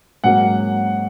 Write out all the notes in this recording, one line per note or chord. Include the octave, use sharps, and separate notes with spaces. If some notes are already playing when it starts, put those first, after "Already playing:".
G#2 F#3 A#3 C#4 F#5